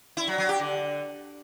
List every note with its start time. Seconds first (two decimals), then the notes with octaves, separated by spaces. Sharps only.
0.17 E4
0.28 F#3
0.38 F#3
0.49 G4
0.60 D3